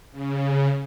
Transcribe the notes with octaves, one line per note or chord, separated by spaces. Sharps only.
C#3